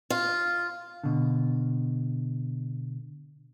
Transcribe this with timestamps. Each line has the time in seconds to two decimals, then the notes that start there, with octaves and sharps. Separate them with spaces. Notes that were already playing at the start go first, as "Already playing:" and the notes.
0.10 F4
1.04 B2 D3